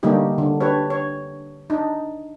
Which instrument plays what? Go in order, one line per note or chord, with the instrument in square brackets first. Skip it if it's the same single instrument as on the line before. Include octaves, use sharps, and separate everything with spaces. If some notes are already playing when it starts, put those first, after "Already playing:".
[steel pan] D3 G3 A3 A#3 D#4 G4
D3
D4 G4 B4 C#5
C#5
D4 D#4